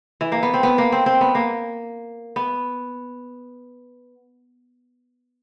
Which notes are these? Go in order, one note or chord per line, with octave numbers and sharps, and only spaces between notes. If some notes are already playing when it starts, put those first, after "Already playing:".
E3
A#3
B3
C4
B3
A#3
C4
C4
B3
A#3
B3